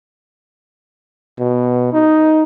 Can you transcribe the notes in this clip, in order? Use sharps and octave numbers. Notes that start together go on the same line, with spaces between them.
B2
D#4